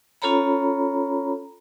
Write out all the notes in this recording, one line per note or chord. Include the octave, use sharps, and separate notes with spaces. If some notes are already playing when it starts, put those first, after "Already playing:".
C#4 F4 A4 C#5 A#5 B5